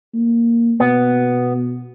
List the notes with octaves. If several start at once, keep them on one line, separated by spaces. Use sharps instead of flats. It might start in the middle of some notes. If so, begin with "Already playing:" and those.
A#3
B2 B3